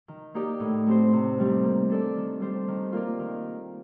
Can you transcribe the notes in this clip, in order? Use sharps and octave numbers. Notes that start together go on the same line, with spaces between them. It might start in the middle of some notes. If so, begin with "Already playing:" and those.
D#3
A#3 D#4 G4 D5
A2
A3 C4 G4 C5
C3
D#3 G3 C4 G4
A#3
D4 A4 D5
D#3
G3 D4 G4 C5
D#3
A#3 F4 A#4 D5
D#3